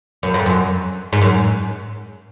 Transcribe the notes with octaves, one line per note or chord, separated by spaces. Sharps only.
F#2
F2
F#2
G#2
F#2